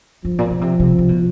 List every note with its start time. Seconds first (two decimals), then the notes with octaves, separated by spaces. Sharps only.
0.25 G2 F3
0.38 A#2
0.50 B2
0.61 C3
0.80 C3
0.99 C3
1.09 B2